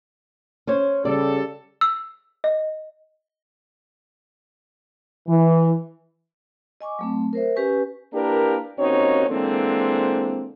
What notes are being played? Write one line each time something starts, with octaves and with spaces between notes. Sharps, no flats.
C#4 C5 C#5
C#3 G3 A4 D5
E6
D#5
E3
D#5 G#5 C#6 D6
F#3 A3 C4
A#4 C5 E5
C#4 G4 B4 G#5 C#6
A#3 D4 E4 G4 A#4 B4
D#2 C4 C#4 D#4 F#4 C#5
D3 E3 G#3 A#3 C4